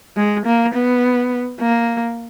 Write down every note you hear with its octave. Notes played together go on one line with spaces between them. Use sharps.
G#3
A#3
B3
A#3